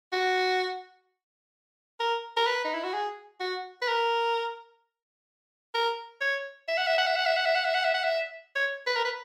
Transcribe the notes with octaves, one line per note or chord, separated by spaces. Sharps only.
F#4
A#4
A#4
B4
D#4
E4
F#4
G#4
F#4
B4
A#4
A#4
C#5
E5
F#5
E5
F#5
E5
F#5
E5
F#5
E5
F#5
E5
F#5
E5
F#5
E5
C#5
B4
A#4
B4